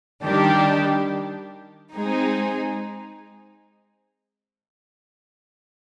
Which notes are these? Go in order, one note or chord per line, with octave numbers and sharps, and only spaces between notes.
D#3 G3 D4 G4
G#3 C4 D#4 G#4